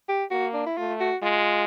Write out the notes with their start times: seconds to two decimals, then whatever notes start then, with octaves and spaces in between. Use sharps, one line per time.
0.09 G4
0.31 A#3 F#4
0.54 D4
0.66 E4
0.77 A3 F4
1.01 F#4
1.23 G#3 F4